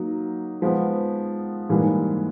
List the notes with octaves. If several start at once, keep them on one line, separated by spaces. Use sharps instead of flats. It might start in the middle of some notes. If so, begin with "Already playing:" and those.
Already playing: F#3 A#3 D#4
F3 G#3 B3
G#2 E3 G3 A#3